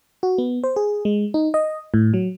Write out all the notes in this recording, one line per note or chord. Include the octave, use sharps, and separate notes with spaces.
F#4
B3
C5
G#4
G#3
D#4
D#5
A2
F#3